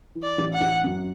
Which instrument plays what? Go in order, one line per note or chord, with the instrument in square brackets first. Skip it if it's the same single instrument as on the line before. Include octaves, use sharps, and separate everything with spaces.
[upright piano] E3
[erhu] D5
[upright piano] A1
[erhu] F#5
[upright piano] A1
F#2